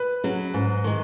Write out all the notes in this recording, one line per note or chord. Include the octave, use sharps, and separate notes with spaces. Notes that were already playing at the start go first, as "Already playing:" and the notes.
Already playing: B4
F#3 C#4 G#4
G#2
D#3 G#3